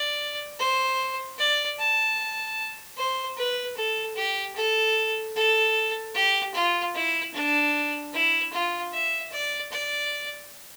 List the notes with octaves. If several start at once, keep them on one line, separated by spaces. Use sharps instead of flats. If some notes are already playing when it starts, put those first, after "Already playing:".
Already playing: D5
C5
D5
A5
C5
B4
A4
G4
A4
A4
G4
F4
E4
D4
E4
F4
E5
D5
D5